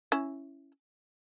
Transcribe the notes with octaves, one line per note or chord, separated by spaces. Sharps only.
C#4 E4